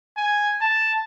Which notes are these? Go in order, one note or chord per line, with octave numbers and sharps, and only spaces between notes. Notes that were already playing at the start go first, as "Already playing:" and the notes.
G#5
A5